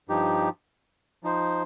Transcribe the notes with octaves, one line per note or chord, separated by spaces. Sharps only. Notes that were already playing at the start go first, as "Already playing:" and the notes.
G2 F3 D#4 G4
F3 D#4 C5